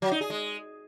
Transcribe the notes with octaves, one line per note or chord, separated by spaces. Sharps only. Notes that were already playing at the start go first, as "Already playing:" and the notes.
F#3
D#4
G#4
G#3